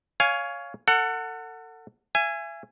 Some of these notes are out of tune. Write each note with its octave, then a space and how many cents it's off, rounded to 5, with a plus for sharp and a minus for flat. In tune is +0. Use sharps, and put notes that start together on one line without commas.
C#5 +15 F5 +0 G#5 +0
A4 +35 F#5 +0
E5 +40 G#5 -5